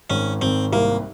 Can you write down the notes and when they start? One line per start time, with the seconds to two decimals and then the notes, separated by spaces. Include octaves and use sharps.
0.10 G#1 C#4
0.41 G#1 C4
0.72 C2 A#3